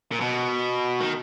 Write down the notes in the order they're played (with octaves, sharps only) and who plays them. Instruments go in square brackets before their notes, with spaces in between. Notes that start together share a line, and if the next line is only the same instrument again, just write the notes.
[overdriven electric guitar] A#2
B2
D#3